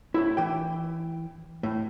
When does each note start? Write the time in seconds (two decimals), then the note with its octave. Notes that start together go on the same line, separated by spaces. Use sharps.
0.14 A2 E4
0.37 E3 G5
1.63 A2